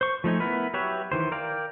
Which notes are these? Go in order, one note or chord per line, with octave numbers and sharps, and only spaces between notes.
C5 C#6
F3 A3 D#4 G#5
B3 E4 A#4 B4
F#3 G4 B4 C#5 E5
D#3 E3 C5
A#4 D5 F5 G5